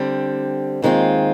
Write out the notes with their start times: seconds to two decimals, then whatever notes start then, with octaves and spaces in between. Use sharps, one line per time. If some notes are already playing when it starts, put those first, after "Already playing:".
Already playing: D3 G3 C4
0.82 D#2 D#3 G#3 C4 F4